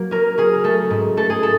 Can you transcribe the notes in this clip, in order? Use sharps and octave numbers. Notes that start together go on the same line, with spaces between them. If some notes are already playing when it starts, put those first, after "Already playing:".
Already playing: F#3 A#3
C#4 A#4
C#4 G#4
A3 A4
G#2
A3 A4
G#4
A4